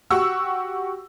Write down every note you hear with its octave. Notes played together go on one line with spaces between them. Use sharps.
F#4 G4 F#5 C#6 E6